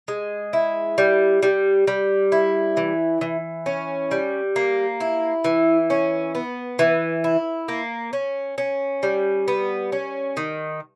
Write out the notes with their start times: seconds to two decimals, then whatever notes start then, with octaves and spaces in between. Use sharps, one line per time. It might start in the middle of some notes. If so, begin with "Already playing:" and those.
0.08 G#3
0.53 E4
0.98 G3
1.42 G3
1.87 G3
2.32 E4
2.77 E3
3.21 E3
3.66 C#4
4.11 G3
4.56 A#3
5.00 E4
5.44 E3
5.90 C#4
6.35 B3
6.79 E3
7.24 E4
7.68 A#3
8.13 C#4
8.58 C#4
9.03 G3
9.48 B3
9.92 C#4
10.37 D#3